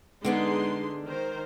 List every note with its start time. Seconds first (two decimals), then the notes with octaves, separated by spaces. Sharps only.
0.25 D3 G#3 B3 D4 D#4 C6
1.06 D#3 A#4 C5